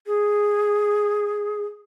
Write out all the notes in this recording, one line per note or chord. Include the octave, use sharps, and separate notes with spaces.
G#4